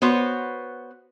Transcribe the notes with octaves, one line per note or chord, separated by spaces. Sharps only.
B3 F#4 C5 C#5